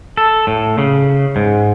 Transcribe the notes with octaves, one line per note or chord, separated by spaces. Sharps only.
A4
A2
C#3
G#2